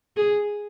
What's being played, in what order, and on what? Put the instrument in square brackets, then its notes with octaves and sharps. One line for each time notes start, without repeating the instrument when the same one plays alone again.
[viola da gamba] G#4